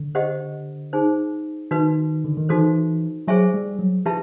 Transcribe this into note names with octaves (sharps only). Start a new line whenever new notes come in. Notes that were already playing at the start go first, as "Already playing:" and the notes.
Already playing: D3
G4 C5 D#5 F#5
D#4 G#4 C5
D#3 D#4 F#4 B4
D3
D#3
E3 D#4 F#4 A4 C5
F#3 G#4 C5 E5 G#5 C#6
G3
F#3
F3 E4 G4 B4 E5 A5